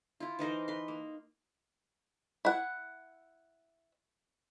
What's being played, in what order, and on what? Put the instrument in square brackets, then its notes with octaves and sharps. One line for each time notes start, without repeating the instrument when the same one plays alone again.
[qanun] E4 F4
E3 D#4 A#4 C5
B4 C6
A#3
[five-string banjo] E4 F#5